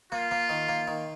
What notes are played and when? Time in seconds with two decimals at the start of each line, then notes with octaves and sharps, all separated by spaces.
0.12 A#3 F4
0.31 A#3
0.49 D#3
0.69 A#3
0.87 D#3